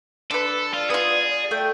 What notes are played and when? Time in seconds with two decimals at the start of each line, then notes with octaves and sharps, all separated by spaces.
0.31 D3 A4 B4
0.73 F4 D5
0.90 B3 F4 G#4
1.51 A3 G5